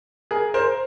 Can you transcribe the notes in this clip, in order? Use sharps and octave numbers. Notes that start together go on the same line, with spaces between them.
G#4 A#4
A#4 C5